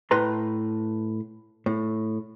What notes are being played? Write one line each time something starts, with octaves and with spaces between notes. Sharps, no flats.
A2 B4 A#5 C6
A2